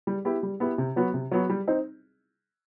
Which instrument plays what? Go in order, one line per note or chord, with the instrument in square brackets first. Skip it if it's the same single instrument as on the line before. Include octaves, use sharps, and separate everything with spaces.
[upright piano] G3
B3 E4 G4
G3
B3 E4 G4
C3
F#3 B3 F#4
C3
F#3 B3 F#4
G3
C4 D#4